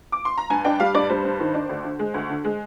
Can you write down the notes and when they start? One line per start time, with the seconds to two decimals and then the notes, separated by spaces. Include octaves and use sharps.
0.12 D6
0.25 C6
0.38 A#5
0.50 G2 G#5
0.64 D4 G5
0.80 G3 F5
0.94 G2 D5
1.09 G3 C5
1.25 G2
1.40 D#3
1.54 D4
1.69 D2
1.84 D3
1.99 G#3
2.14 D2
2.29 D3
2.44 G#3